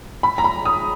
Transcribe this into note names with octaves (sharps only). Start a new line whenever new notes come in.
B5
A#5
B5
D#6